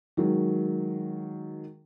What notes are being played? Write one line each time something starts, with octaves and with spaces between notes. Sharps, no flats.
D#3 F#3 G#3